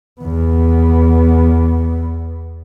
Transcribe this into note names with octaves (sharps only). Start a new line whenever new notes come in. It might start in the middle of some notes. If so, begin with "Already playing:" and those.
E2 B3